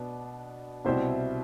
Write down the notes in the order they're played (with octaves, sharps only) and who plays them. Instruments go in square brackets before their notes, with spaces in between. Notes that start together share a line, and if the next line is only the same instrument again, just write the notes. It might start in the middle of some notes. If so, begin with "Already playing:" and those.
Already playing: [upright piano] B2 B3 D4
C2 B2 G3 C4 E4 C5 E5